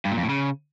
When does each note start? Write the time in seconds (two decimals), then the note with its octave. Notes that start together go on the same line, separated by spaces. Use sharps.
0.05 G2
0.11 A#2
0.17 F2
0.23 A2
0.29 C#3